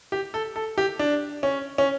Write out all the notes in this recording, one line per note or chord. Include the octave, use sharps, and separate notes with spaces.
G4
A4
A4
G4
D4
C#4
C#4